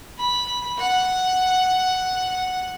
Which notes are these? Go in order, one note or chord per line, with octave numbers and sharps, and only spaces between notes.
B5
F#5